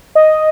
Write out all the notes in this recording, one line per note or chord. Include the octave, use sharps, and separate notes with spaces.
D#5